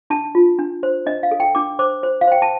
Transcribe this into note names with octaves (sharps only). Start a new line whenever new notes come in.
D4 A5
F4
D4
C5
D4 D#5
F5
A4
G5
D4 D6
C5 D6
C5
F5
C5 G5
A5